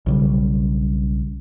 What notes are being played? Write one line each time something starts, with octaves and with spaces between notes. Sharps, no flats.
B1 C#3 G3